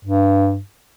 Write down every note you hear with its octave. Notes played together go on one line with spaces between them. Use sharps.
G2